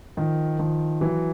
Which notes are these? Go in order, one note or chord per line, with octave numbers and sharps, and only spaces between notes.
D#3 F3
D#3 F3
E3 F#3